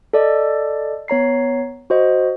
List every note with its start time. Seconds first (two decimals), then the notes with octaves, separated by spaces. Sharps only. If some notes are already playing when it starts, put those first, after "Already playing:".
0.13 A4 D5 D#5
1.08 B3 C#5 A#5 C7
1.90 F#4 C5 D#5